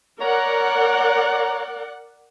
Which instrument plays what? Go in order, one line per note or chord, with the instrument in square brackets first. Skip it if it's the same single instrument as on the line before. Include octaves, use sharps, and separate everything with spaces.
[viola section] A#4 D5 F#5 [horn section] C#5 A#5